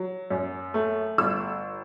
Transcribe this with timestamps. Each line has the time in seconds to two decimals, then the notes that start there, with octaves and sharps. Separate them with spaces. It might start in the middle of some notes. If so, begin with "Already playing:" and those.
Already playing: F#3
0.30 F#2
0.74 A3
1.18 G1 E6